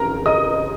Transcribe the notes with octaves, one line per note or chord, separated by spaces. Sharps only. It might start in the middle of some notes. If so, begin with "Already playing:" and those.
Already playing: F1 E2 C#3 A#4 A#5
D#5 D#6